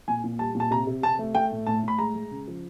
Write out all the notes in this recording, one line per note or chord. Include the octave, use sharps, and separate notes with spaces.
A#2 G#5
A#2
G3 A5
A#2
A5
C3 A#5
C3
C3 A5
A3
A3 G5
A2
A2 A5
A2 B5
G#3 A#5
G#3
C#3
F3